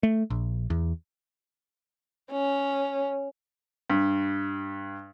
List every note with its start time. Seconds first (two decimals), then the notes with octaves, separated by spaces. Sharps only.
0.03 A3
0.30 A#1
0.70 E2
2.31 C#4
3.90 G2